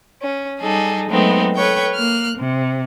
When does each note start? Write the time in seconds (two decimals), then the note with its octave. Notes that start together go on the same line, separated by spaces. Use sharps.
0.21 C#4
0.61 G3 D#4 G#4 A4
1.09 F#3 G#3 A3 B3 C4 D#4
1.56 A4 B4 C#5 G5 C#6
1.95 A#3 F6 F#6
2.37 C3